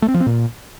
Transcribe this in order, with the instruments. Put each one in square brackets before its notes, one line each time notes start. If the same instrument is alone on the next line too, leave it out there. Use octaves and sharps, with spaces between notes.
[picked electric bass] A3
C4
F3
C4
A#2